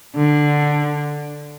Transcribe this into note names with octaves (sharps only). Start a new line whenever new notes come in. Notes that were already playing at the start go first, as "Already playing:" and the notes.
D3